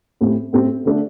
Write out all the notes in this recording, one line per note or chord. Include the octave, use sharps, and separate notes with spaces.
A2 A3 C4 G4
A2 A3 C4 G4
D3 A3 D4